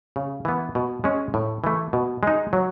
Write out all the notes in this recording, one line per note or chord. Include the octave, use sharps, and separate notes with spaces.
C#3
E3 B3
B2
G#3 C#4
A2
E3 A3
B2
G#3 D#4
F#3